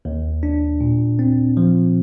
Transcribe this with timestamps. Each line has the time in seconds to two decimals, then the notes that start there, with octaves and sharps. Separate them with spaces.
0.05 D#2
0.43 D4
0.81 A#2
1.19 C4
1.57 F3